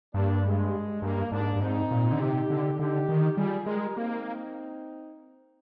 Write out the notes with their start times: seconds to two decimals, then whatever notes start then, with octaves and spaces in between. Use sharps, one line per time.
0.14 G2 A#3 D4
0.44 G#3
1.02 G2 A#3
1.32 G#2 A#3 D4
1.55 G2
1.61 G#2 C4 D#4
1.91 A#2
2.12 D3
2.20 C3 D#4 G4
2.50 D3
2.78 D3 D#4 G4
3.09 D#3
3.37 G3 F4 G#4
3.66 G#3 G4 A#4
3.96 A#3 C4 D#4